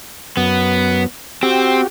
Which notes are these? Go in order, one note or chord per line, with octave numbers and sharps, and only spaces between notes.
F#2 B3
C4 F#4 G4